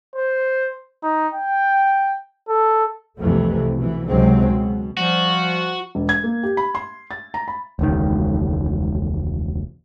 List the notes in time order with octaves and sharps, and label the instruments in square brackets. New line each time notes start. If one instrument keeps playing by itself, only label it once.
[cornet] C5
D#4
G5
A4
[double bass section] C2 F2 C3 E3 A3
B2 E3
C#2 C3 D#3 F#3 G#3 C4
B2
[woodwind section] F3 G3 [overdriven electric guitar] F#4
[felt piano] E1
G#6
A#3
G4
B5
C6
A6
A#5
B5
[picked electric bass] E1 C#2 D#3